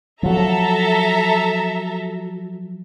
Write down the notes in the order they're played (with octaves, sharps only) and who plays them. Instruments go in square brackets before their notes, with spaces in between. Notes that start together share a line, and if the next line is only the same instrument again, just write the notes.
[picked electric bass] F3 F#3 [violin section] A4 E5 A#5